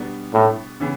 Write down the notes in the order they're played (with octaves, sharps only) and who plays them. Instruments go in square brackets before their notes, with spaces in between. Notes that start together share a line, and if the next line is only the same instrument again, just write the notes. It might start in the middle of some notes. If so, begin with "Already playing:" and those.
Already playing: [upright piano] B2 G3 B3 D4
[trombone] A2
[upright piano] C#3 E3 B3